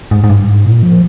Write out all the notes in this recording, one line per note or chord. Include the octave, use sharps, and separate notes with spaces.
G#2
G#2
G2
G#2
A#2
F3